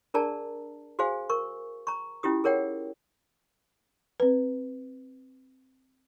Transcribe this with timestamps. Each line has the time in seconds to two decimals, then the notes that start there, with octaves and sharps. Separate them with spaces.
0.14 D4 G#4 A#4 D5 A5 A#5
0.99 F#4 G#4 C5 F5 G#5
1.30 A#4 C#6
1.87 A#5 C#6
2.23 C#4 E4 F4 G4 D#6
2.44 G#4 A#4 C#5 F#5 G5
4.20 C4 B4